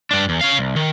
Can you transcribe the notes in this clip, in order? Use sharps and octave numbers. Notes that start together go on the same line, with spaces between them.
G2 D4
E2
C#4 F5
C2
D#3